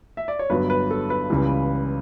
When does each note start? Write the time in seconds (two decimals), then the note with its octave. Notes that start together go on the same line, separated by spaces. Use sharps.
0.17 E5
0.28 D5
0.39 C#5
0.50 G1 G2 F#3 B4
0.70 B4
0.91 A4
1.10 B4
1.30 C#2 C#3 E3 G3